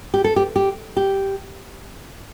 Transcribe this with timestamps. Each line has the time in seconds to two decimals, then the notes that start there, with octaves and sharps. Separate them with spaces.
0.14 G4
0.24 A4
0.36 G4
0.56 G4
0.97 G4